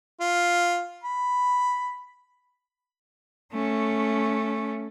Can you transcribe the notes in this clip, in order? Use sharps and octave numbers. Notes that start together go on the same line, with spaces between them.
F4
B5
A3 C#4